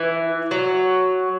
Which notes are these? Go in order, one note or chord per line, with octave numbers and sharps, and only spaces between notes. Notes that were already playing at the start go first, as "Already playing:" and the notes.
Already playing: E3
F#3